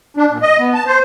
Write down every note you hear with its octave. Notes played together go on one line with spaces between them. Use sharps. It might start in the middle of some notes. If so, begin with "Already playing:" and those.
D4
A#2
D#5
B3
A5
C5